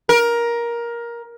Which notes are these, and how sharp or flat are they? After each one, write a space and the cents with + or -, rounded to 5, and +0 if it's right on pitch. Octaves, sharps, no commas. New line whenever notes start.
A#4 +15